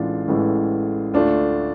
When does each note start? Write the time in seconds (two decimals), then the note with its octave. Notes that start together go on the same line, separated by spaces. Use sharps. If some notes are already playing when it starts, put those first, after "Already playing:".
Already playing: A1 A2 E3 G#3 D4 F4
0.28 A1 A2 E3 G#3
1.14 D2 D3 A3 D4 F4